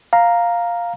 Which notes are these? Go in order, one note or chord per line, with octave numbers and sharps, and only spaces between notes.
F5 A#5